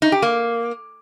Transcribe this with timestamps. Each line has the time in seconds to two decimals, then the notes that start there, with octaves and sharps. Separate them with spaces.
0.02 D#4
0.12 G4
0.22 A#3